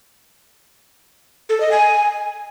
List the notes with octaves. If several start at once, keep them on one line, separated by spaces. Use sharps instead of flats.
A4
D#5
G#5